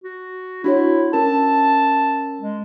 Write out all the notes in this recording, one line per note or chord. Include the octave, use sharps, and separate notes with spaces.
F#4
D4 E4 F#4 C#5
C#4 A#4 A5
G#3